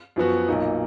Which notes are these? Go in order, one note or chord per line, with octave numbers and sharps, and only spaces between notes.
F#2 F3 B3 F#4
B1 A#2 F#3 A#3 D#4